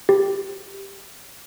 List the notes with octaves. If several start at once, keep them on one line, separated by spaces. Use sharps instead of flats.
G4